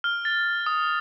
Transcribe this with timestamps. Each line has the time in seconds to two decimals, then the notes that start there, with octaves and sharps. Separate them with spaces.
0.04 F6
0.25 A6
0.66 D#6